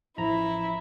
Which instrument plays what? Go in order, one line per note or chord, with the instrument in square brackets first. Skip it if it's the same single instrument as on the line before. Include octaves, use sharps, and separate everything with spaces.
[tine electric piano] A1 F3 A#5 [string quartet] E4